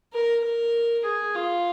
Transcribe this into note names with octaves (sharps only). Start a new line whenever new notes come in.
A#4
A#4
G#4
F4